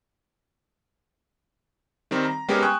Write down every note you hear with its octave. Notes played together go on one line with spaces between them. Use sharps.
D#3 G3 C4 A#4
A#5
G3 G#3 B3 C#4 G4 A#4
G5 G#5 C#6 D#6 E6 F#6